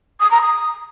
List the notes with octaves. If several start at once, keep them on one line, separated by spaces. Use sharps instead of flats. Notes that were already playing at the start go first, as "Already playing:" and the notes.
D#6
A#5
D#6